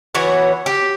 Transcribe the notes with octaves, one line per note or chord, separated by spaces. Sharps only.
E3 B3 F#4 C#5
G4